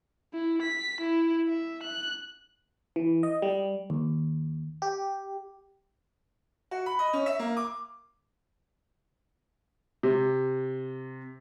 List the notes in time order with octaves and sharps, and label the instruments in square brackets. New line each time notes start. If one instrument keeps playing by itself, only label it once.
[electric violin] E4
B6
E4
E5
F#6
[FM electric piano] E3
D#5
G3
D#2
G4
[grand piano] F#4
B5
D#5
C#4
E5
A#3
D6
C3